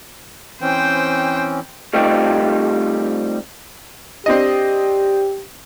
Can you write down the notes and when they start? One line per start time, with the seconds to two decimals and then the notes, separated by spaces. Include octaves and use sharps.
0.62 E3 C4 C#4 C5 G5
1.93 G3 A3 C4 D#4 F4 G4
4.26 C4 D4 G4 D#5